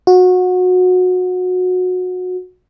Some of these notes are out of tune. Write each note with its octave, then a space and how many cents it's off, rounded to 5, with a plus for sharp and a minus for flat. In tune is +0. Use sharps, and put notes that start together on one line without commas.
F#4 -20